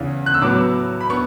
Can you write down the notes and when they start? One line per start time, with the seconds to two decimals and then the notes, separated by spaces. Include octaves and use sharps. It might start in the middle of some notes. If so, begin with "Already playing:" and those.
Already playing: E2 C#3 E3
0.26 F#6
0.34 E6
0.41 A2 F#3 B3 D6
1.01 B5
1.10 B3 C#6